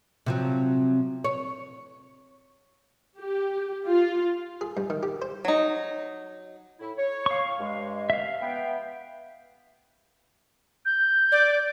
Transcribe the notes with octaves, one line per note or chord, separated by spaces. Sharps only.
C3 F3 F#3
C#5
G4
F4
G#4
G2
D#3
G4
C5
F#3 D#4
A2 E4
C#5
F5 C#6
G2 G#3
E5 F5
B3 G5
G6
D5